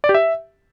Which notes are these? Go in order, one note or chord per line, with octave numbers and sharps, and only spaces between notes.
D5
G4
E5